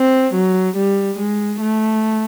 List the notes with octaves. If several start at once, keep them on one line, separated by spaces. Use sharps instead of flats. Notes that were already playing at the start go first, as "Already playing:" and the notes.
Already playing: C4
F#3
G3
G#3
A3